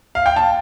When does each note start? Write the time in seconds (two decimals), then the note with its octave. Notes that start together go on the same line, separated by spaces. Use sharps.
0.15 F5
0.26 G5
0.36 A5